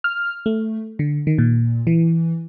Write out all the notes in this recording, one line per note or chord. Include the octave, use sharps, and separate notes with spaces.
F6
A3
D3
D#3
A#2
E3